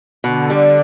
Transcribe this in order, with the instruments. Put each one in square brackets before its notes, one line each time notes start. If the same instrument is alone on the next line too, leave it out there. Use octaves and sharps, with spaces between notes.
[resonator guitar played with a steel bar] B2 [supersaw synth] D3
[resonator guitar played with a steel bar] G3